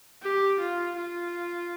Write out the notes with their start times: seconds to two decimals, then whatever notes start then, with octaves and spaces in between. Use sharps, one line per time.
0.22 G4
0.60 F4
0.96 F4